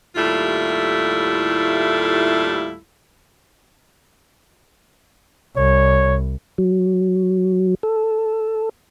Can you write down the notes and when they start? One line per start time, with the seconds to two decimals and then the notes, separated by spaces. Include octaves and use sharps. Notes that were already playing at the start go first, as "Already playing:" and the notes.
0.16 D#2 A2 G3 A3 E4 F4
5.57 C2 C#5
6.58 F#3
7.83 A4